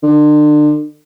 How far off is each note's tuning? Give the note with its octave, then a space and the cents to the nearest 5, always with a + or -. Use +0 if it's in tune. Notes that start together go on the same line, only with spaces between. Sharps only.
D3 +35